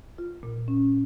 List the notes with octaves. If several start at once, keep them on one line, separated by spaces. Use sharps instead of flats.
F4
A#2
C#4